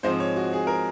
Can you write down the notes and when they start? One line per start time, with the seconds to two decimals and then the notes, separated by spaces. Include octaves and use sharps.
0.03 G#2 F3 G#3 C4 C5
0.20 C#5
0.36 F#4
0.53 G#4
0.67 A#4